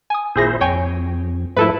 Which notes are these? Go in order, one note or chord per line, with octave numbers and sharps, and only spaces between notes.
G#5 D#6
G#1 A#2 E4 G#4 C5 A#6
F2 C#5 G5 G#5
G#2 F3 A3 E4 A4 B4